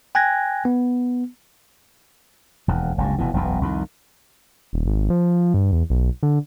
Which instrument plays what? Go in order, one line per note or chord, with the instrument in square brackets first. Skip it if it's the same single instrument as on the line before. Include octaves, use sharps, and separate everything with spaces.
[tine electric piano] G5 G#5 F#6 G#6 A#6
B3
[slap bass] E1 D#2
F#1 C#2 G2
F1 B2 E3
E1 B1 F#2 B2
C2 F2 D#3
[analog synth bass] D#1
G#1
F3
G2
E2
B1
D3